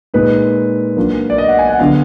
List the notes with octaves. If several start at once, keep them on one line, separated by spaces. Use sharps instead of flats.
A#2 G#3 D#4 B4
F#3 A#3 D4 F4
D5
D#5
F#5
G#5
F#5
D3 F#3 B3 D4 F4 F5